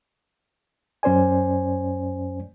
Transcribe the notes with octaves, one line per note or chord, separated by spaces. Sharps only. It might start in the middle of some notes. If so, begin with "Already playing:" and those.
F#2 C#4 C5 D5 G#5